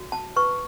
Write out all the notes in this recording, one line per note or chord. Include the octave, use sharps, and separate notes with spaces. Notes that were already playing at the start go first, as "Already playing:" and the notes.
Already playing: F#4
A5
B4 C#6